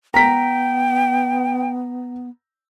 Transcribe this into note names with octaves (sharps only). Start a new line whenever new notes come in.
B3 G5 A#5 B6